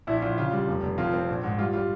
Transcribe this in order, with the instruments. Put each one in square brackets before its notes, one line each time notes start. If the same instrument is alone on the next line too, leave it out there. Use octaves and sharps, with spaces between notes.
[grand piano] A#1 E4
A#1 F4
C#3 F4
G3
F1
F1
F2 F4
C4
A#1
G#2
G3 F4
G3 F4